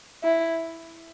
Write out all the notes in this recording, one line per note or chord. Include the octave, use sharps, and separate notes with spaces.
E4